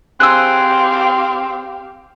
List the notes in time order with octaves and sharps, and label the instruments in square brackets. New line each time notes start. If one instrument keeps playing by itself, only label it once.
[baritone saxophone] C4 [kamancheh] G4 F5 [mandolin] G#4 C5 G#5 [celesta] E6 F#6